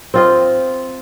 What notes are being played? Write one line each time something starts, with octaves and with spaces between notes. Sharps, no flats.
C4 F4 D#5